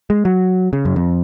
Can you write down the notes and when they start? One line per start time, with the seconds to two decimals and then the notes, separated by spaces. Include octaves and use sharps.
0.10 G#3
0.25 F#3
0.73 C#3
0.85 F#2
0.96 F2